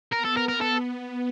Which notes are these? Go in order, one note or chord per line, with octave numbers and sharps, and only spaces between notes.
B3 A#4
A4
A#4
A#4
A4